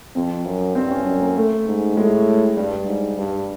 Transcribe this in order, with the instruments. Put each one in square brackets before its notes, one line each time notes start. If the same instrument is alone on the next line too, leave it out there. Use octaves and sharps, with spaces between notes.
[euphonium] F2 [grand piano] C4
[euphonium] F#2
[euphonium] G2 [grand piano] C4
[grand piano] C#4
[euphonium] F#2
[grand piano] A#3
A3
[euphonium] G#2
[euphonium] A2 [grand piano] G#3
[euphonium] G2 [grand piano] G3
[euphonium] G#2
G2